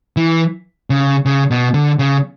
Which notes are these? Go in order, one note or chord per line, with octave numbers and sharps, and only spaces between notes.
E3
C#3
C#3
B2
D3
C#3